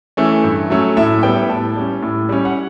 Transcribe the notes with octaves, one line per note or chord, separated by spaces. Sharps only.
E3 A3 C#4
G2
F#3 A3 C#4
A2 E5
G3 B3 G5
A2 A5
G3 C#4
A2
G3 C#4
F#5